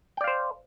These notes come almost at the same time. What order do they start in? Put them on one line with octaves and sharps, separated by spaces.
G5 D5 F5 C5